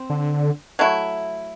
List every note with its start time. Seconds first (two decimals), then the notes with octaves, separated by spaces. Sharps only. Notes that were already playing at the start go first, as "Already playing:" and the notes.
Already playing: C4
0.10 D3
0.79 F#3 A3 E4